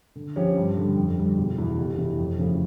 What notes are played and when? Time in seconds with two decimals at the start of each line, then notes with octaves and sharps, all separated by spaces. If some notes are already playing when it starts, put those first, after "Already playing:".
0.16 D3
0.36 F3 C#4 G4 C#5
0.56 G2
0.77 D3 G3
0.97 F2
1.18 D3 G3
1.37 E1
1.57 E2 E3
1.78 F1
1.98 E2 E3
2.19 F2
2.39 C#3 F3 A3 E4